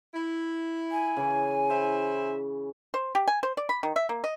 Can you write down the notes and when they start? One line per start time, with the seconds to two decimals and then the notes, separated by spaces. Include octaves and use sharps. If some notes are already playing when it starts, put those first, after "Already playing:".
0.15 E4
0.91 G#5
1.17 C#3 E3
1.70 E4 C5 E5
2.94 C5
3.15 G4
3.28 G#5
3.43 C5
3.57 D5
3.69 B5
3.83 D#3
3.96 E5
4.09 A#3
4.24 D#5